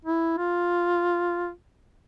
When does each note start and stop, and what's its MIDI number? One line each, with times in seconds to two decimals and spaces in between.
0.05 0.35 64
0.38 1.50 65